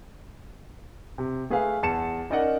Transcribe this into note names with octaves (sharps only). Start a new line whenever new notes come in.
C3
A3 G#4 B4 F5
E2 A5 C#7 E7
C#4 D#4 A#4 D5 D#5 F#5